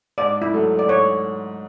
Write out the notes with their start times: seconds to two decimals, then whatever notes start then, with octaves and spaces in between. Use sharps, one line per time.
0.18 G#2 D5
0.42 E4
0.53 F#3 A3
0.79 D5
0.88 G#2 C#5